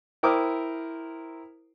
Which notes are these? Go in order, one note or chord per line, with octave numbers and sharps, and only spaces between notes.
E4 A#4 C5 G5 D6 D#6